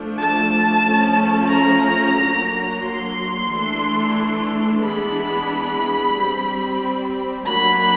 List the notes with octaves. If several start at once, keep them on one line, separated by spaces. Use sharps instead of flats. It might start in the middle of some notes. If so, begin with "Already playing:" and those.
Already playing: F3 A3 D4
A5
F3 A3 C#4
A#5
F#3 A#3 D4
C6
E3 A3 D4
E3 G#3 B3 D4 B5
G3 C4
F#3 A#3 D4 B5